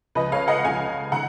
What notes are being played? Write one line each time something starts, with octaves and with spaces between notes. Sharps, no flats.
C#2 C#3 F3 B4 D#5
C#5 F5
D#5 F#5
C#2 C#3 F3 F5 G#5
D#3 F#5 A#5